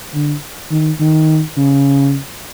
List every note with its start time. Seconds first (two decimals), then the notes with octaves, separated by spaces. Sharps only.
0.14 D3
0.71 D#3
1.00 D#3
1.57 C#3